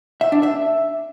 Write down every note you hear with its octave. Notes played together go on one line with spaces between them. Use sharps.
E5
D4
E5